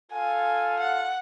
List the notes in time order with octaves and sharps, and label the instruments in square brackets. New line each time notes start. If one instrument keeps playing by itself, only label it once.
[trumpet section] F4 A4 F5 [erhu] G#5
[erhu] F#5